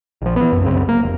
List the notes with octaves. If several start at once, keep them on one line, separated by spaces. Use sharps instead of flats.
A#1 F3
E3 B3
C2 F#2
C2 F#2 C#3 C4
A#3
F1